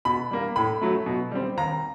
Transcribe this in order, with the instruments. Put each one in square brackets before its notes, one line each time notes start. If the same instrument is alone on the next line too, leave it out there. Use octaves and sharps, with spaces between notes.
[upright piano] B2 B5
G3 A#3
A2 B5
F#3 A3
B2
G3 C4
D#2 A#5